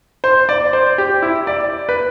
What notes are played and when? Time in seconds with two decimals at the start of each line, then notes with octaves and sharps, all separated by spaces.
0.24 C5
0.49 D5
0.73 C5
0.98 G4
1.22 E4
1.47 D5
1.89 B4